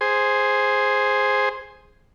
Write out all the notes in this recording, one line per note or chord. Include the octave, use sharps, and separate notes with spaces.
G#4 C5